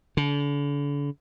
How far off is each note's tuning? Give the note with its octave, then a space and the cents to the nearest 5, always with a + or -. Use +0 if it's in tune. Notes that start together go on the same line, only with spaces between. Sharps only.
D3 -40